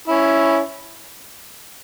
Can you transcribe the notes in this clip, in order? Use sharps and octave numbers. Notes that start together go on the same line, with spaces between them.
C#4 E4